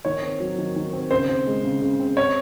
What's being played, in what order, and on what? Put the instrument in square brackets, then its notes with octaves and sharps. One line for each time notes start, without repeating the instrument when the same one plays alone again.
[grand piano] D#3 C#5
C4
F#3
D#3
D#3
C4
C#3 C5
C4
G#3
C#3
C#3
C4
C4 C#5